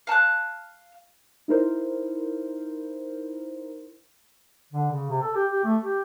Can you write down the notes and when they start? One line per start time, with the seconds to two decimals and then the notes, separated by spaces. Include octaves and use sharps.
0.07 F5 A5 C#6 F#6
1.48 D#4 E4 A#4 C5
4.73 D3
4.91 C#3
5.09 C3
5.21 A4
5.35 G4
5.52 G4
5.64 A3
5.84 G4